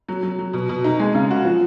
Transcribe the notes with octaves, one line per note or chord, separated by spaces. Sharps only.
F#3
F#3
F#3
B2
B2
D#4
G#3
C#3
F#4
F3